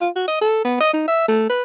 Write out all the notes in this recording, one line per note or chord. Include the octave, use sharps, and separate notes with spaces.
F4
F#4
D#5
A4
B3
D#5
D#4
E5
A3
B4